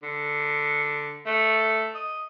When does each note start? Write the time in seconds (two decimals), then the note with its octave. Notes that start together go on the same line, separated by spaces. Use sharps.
0.03 D3
1.26 A3
1.95 D#5